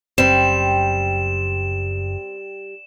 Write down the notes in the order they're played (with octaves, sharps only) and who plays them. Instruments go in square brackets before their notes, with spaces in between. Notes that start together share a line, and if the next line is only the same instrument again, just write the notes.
[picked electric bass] F#1 F#2 [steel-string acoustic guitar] G3 [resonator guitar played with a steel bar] C4 [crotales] E7